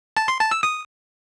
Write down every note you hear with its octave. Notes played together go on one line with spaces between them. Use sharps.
A5
C6
A5
E6
D#6